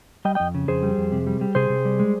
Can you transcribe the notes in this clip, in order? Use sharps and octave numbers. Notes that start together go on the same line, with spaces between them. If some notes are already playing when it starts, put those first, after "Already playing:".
G3 D#5 G5
F2 D#5 G5
C#3
F2 G#4 C5
G3
F2
C3
G3
G3
C3 G#4 C5
C3
G3
G#3